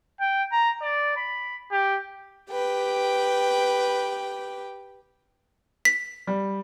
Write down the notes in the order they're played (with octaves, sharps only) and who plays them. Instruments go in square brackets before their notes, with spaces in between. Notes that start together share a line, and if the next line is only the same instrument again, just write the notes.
[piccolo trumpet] G5
A#5
D5
B5
G4
[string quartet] G4 B4 G5
[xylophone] B6
[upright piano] G3